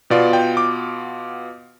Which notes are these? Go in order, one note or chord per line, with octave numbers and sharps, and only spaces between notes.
B2 B3 F4 D5
G5
D6